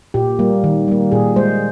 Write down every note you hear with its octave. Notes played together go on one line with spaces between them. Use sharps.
A#2 G4
G3 A#3
D#3
G3 A#3
A#2 G#4
G#3 C5